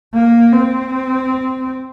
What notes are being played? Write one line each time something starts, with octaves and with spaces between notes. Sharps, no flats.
A#3
C4